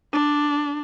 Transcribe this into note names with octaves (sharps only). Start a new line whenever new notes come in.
D4